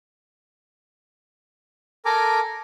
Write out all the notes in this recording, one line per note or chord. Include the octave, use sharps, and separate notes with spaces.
A4 A#4 G#5 A#5 D6